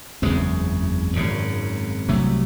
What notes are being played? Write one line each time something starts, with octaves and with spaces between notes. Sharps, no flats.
F#1 E2 C#3 G#3 C4
G#1 F#2 C#3
C2 C3 F#3 A3